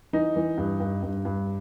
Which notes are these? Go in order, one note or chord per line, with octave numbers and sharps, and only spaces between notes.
E3 D#4
E3
G2
G2
G2
G2